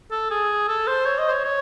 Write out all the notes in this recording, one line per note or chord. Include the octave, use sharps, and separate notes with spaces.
A4
G#4
A4
C5
C#5
D#5
C5
C#5
C#5